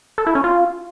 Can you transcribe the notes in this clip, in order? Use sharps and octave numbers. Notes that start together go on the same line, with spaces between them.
A4
E4
C#4
F4